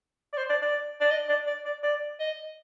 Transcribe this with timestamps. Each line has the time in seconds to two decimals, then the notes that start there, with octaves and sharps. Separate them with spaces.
0.33 D5
0.38 C5
0.50 D5
0.62 D5
1.01 D5
1.11 D#5
1.29 D5
1.47 D5
1.65 D5
1.83 D5
2.20 D#5